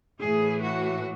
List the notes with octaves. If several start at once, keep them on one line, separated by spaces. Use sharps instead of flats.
A2 E3 G#4
F#4